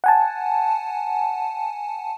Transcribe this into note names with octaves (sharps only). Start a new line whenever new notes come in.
F#5 G#5 A5